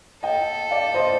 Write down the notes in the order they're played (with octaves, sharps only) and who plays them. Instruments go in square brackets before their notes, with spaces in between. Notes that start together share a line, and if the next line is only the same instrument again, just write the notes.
[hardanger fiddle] A4 [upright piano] D#5 G5
[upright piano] D5 F5
C5 D#5